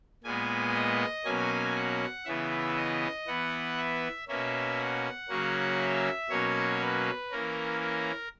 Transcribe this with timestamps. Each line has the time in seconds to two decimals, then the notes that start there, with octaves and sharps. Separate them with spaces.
0.24 A#2 G#3 B3 G#5
0.75 D#5
1.25 B2 F#3 A#3 C#4 G#5
1.75 F#5
2.25 C#3 E3 B3 E5
2.77 D#5
3.27 E3 B3 F#5
3.77 E5
4.28 B2 A#3 C#4 E5
4.78 F#5
5.29 C#3 F#3 A#3 C#4
5.79 E5
6.30 B2 F#3 A#3 C#4 C#5
6.81 B4
7.31 E3 A#3 C#4 A#4
7.80 A#4